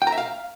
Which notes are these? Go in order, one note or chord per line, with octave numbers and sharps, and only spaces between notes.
G5
A#5
E5
F5